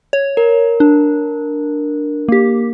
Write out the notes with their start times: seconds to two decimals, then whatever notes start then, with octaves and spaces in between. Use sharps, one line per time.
0.13 C#5
0.37 A#4
0.80 D4
2.28 A#3 G4